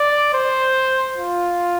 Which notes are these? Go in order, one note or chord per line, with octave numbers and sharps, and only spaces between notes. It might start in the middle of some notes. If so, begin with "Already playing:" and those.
Already playing: D5
C5
F4